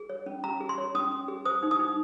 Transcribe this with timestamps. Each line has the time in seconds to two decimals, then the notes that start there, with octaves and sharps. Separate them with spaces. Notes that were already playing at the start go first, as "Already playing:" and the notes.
Already playing: G#4
0.10 C#5
0.26 C#4
0.44 C#4 A#5
0.60 G#4
0.69 C6
0.78 C#5
0.95 C#4 D#6
1.11 C#4
1.28 G#4
1.45 C5 D#6
1.63 D#4
1.71 D#6
1.80 D#4